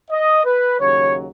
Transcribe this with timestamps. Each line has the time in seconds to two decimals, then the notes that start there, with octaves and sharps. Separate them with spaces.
0.11 D#5
0.45 B4
0.79 D#2 C#3 F#3 C#5